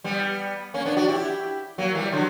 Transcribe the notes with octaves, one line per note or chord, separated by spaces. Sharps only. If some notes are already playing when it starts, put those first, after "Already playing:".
G3 B3
A#3 C#4
B3 D4
D4 F#4
E4 G4
F#3 A#3
E3 G3
D3 F#3